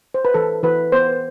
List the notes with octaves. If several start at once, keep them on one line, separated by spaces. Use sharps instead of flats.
C5
B4
E3 A4
E3 B4
B3 C5